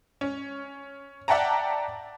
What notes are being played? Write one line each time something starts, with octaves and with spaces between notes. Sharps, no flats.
C#4
D5 E5 F#5 G5 A5 A#5